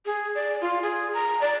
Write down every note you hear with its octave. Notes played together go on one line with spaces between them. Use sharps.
G#4
D5
F4
G#4
A#5
D5